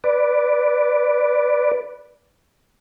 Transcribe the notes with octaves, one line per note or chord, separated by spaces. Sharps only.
B4 D5